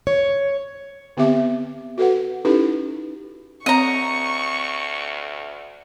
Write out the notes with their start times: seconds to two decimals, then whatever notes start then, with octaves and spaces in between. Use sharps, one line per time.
0.07 C#5
1.17 D3 B3 C4 G4 E5 D6
1.98 F#4 A4 B4 F#5
2.45 C#4 D#4 E4 G4 A4 B4
3.66 D2 C4 C#5 D#5 A#5 C#6